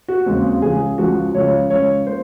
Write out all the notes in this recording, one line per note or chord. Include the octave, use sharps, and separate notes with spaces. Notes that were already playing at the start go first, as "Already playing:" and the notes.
F#4
D#2 C#3 G#3 C4
C#2 C#3 F3 G#4
C#2 C#3 F3 F#4
C#2 C#3 F3 C#5
C#2 C#3 F3 C#5
A#3 C5